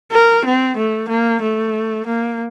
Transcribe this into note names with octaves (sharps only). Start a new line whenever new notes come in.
A#4
C4
A3
A#3
A3
A#3